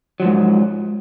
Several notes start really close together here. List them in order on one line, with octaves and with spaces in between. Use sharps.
F#3 F3 G#2